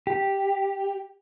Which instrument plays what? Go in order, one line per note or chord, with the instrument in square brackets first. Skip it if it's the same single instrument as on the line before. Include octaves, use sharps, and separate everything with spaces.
[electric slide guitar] G4